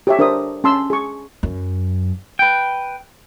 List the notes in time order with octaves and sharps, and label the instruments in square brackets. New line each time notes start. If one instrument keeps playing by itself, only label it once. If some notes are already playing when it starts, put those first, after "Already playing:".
[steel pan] G4 C#5 E5
D4 A#4 C5 E5 D#6
C#4 A5 C6 E6
G#4 C#6
[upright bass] F#2
[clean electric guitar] B4 G5